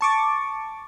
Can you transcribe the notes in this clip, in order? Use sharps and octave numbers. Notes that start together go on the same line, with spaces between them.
A5 C#6 D6